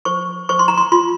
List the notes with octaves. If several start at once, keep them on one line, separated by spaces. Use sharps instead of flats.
C5 C#6
C5 C#6
C6
A#5
C6
F4 C6